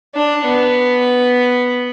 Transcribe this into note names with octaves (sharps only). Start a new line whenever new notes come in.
D4
B3